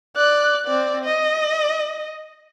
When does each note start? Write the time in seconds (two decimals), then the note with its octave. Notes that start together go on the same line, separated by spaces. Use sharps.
0.17 D5 F#6
0.67 C4 D5
1.05 D#5